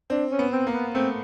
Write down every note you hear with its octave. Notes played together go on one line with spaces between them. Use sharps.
C4 D4
C#4
B3
C4
A#3
B3
A3 C4